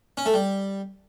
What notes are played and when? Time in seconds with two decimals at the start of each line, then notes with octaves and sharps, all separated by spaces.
0.17 C#4
0.26 A3
0.34 G3